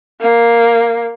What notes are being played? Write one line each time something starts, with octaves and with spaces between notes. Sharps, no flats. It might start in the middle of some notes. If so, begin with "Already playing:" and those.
A#3